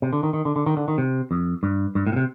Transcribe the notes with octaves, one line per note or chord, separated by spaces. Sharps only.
C3
D3
D#3
D#3
D3
D3
D#3
D3
D#3
C3
F2
G2
G2
A2
A#2
C3